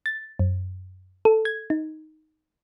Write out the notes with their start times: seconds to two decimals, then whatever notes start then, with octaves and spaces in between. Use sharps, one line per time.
0.06 A6
0.39 F#2
1.25 A4
1.45 G#6
1.70 D#4